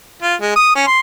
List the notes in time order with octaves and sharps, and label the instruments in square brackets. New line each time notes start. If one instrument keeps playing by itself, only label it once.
[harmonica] F4
G#3
D#6
C#4
C6